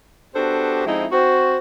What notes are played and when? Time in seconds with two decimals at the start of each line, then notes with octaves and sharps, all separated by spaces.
0.34 B3 D4 F#4 G4 A4 C5
0.86 F3 G#3 C4 D#4 E4
1.11 C4 F#4 C5